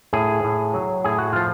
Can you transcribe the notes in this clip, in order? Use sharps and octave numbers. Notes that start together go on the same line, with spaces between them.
A2 G#4
A2
F#3
A2 G#4
F#4
F3 F4